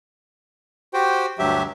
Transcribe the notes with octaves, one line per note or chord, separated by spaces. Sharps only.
F#4 G4 C5 G5
D2 G2 F#3 G4 E5